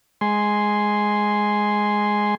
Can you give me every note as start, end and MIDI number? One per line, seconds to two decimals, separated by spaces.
0.21 2.35 56
0.21 2.35 80
0.21 2.35 84